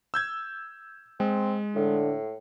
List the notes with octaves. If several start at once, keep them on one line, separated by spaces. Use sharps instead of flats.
E6 G6 G#6
G#3 C4
A2 D3